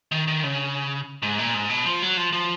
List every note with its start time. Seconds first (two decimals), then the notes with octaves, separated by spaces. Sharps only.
0.12 D#3
0.28 D#3
0.43 C#3
1.22 G#2
1.39 A#2
1.54 G#2
1.70 B2
1.86 F3
2.02 F#3
2.17 F3
2.33 F3